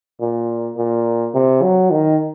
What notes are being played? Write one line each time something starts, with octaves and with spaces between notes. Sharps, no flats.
A#2
A#2
C3
F#3
D#3